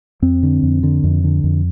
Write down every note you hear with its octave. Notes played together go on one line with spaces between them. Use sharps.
F2 C4
D3
F2
D3
F2
D3
F2